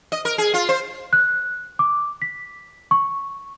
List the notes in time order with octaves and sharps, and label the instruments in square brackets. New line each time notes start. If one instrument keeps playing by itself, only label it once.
[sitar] D#5
A#4
G#4
F4
C5
[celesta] F#6
D6
B6
C#6